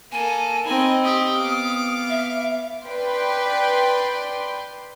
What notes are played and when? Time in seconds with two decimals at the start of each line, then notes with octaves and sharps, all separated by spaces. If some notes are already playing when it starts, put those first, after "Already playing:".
0.12 A#3 A4 G#5
0.66 C4 D#4 D#5 G#5 B5
1.04 G4 D#6
1.37 B3 F5 D6
2.09 E5
2.84 B4 D5 G5 C6